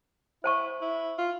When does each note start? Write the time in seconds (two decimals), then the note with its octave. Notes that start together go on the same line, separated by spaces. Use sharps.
0.44 E4 C5 A5 C#6
0.81 E4
1.18 F4